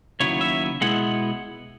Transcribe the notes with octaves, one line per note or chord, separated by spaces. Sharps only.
D#2 C#3 F#3 B3 E4 C#5
E5
B2 G#3 B3 E4 F#5